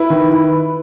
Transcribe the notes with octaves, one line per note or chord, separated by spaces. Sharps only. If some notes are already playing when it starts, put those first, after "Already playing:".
Already playing: E4 B4
D#3
E4